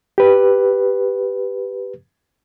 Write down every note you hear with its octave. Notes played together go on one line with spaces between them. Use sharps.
G4 B4